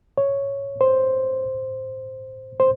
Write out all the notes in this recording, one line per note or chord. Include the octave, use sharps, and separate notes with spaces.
C#5
C5
C5